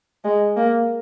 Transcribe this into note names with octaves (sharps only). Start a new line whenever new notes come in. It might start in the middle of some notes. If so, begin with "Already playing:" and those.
G#3
A#3